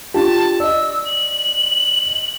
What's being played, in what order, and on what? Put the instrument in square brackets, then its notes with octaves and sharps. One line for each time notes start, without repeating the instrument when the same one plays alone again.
[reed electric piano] D4 F4 G4 [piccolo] A5
[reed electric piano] D5 D#5 [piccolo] E6
[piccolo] F#7